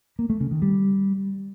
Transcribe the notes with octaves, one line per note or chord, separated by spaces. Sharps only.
A#3
A3
C#3
D#3
G3